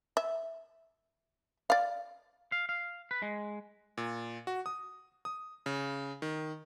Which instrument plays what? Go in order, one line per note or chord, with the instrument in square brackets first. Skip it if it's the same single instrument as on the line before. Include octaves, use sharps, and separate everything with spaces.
[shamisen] E5
D5 F5
[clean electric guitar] F5
F5
B4
G#3
[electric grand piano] A#2
F#4
D#6
D#6
C#3
D#3